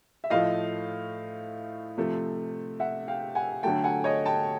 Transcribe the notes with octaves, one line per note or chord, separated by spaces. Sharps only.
E5
A2 F3 A3 D#5 F5
C3 F3 A3
E5 F#5
F5 G5
F#5 G#5
D3 F#3 A3 G5 A5
F#5 G#5
C#5 D#5
G5 A5